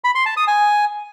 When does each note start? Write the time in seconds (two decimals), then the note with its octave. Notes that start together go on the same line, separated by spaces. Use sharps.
0.04 B5
0.15 C6
0.26 A5
0.37 D#6
0.48 G#5